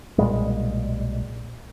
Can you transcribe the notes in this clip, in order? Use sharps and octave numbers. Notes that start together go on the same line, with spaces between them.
B1 A#2 G3 G#3